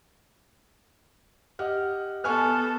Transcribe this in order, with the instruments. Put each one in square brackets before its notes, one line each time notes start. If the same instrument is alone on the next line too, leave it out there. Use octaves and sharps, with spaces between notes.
[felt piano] G4 D#5 F#5 [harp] F6
[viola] B3 A4 [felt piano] B4 G#5 C#6 [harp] F6 F#6